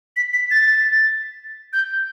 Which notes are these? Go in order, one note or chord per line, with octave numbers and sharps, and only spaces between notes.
B6
B6
A6
G6